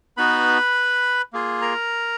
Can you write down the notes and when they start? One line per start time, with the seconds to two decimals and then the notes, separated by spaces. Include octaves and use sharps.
0.17 B3 D#4 F#4 B4 B5
1.33 A#3 F4 G#4
1.62 A#4 A#5